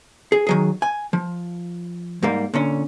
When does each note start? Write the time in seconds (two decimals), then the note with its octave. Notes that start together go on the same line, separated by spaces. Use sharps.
0.32 G#4
0.47 D#3 F#3 G#4
0.82 G#5
1.13 F3
2.23 G#2 G3 A#3
2.54 A#2 D3 C#4